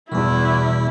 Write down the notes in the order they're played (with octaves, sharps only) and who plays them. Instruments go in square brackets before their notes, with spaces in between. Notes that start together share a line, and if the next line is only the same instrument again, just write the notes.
[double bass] E2 [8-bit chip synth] B2 G3 [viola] E4